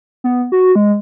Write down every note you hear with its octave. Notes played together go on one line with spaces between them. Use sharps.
B3
F#4
G#3